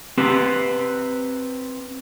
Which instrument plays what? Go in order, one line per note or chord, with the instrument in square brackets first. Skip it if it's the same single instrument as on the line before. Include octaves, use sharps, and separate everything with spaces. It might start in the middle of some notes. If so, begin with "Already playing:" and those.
[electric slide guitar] C4 G4 B4